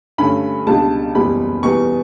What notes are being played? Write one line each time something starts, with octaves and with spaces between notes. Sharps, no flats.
G2 D3 A3 C#4 B5
C#2 B2 G3 D4 A5
F#1 E2 B2 G3 B5
E2 B2 G3 B3 C#6